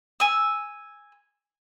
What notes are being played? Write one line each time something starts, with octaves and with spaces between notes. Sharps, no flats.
G#5 E6